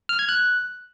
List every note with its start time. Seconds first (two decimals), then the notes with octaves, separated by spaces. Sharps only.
0.09 F6
0.19 G#6
0.29 F#6